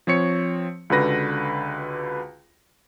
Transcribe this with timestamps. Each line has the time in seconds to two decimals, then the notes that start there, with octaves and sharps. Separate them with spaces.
0.07 F3 C4 C#5 C#7
0.90 C#2 D3 F#4 B4 A#6